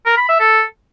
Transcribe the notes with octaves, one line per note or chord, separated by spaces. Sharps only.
A#4
B5
E5
A4